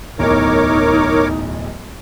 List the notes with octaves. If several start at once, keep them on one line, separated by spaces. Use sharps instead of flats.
D1 B1 E2 D#4 A#4 C#5 D6